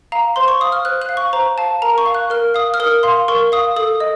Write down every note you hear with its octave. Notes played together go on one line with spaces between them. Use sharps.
F5 A#5
C5 C6
C#6
F5 D#6
F6
C5 F#6
F#6
F5
C#6
C5 A#5
F5 A5
A#4 A#5
C#6
F5
F#6
A#4 F6
F5 D#6
F6
A#4 D#6
F5 C6
A#4 C#6
F5 D#6
A4 D#6
D#5